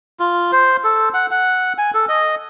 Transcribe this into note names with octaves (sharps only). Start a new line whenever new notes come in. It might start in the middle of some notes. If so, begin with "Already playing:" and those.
F4
C5
A4
F#5
F#5
G#5
A4
D#5